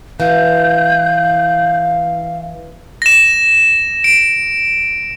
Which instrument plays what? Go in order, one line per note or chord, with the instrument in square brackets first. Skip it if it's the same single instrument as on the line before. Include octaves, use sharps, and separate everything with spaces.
[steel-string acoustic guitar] E3 [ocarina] F5 [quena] G6
[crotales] A#6 E7
D7